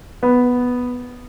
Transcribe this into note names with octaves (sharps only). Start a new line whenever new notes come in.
B3